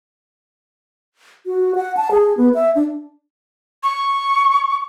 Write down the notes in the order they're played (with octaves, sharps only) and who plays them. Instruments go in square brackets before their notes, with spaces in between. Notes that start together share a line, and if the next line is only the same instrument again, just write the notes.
[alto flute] F#4
F#5
A5
G#4
B3
E5
D4
[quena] C#6